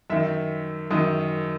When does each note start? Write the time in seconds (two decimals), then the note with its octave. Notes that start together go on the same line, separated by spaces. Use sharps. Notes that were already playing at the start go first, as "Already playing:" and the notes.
0.10 F#2 D#3 E5
0.91 F#2 D#3 D#5